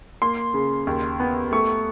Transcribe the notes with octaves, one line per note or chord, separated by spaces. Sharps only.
A#3 C6
C#3
D#2
B3
A3 C#6